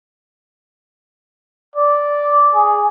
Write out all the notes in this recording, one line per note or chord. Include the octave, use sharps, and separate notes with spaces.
D5
G#4